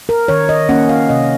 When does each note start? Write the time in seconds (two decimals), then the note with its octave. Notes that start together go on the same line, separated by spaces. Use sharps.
0.09 A#4
0.28 D#3 C#5
0.49 D#5
0.69 A#3 C#4 F#5
0.89 F5
1.09 C3 D#5